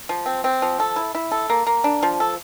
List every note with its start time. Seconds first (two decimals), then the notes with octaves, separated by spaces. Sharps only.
0.09 F3
0.26 C4
0.44 C4
0.62 F3
0.80 A4
0.96 E4
1.15 E4
1.31 A4
1.50 A#3
1.67 A#3
1.84 D4
2.03 F3
2.20 A4